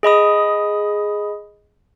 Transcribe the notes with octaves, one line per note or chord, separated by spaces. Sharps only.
G#4 D#5 B5 D#6